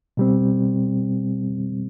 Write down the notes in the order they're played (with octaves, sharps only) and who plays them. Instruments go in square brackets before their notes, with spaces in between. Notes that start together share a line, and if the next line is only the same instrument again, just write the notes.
[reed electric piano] B2 G3 C4